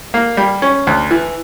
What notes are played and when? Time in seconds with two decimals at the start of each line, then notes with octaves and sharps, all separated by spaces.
0.14 A#3
0.37 G3
0.62 C#4
0.87 D2
1.11 E3